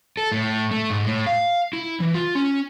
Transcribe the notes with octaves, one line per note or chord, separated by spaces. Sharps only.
A4
A2
A3
G#2
A2
F5
E4
E3
F4
C#4